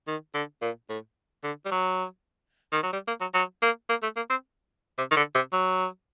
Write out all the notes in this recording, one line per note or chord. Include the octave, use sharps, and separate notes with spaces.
D#3
D3
A#2
A2
D3
G3
F#3
D#3
F#3
G3
A#3
F#3
F#3
A#3
A#3
A3
A#3
C4
C3
D#3
D3
C3
F#3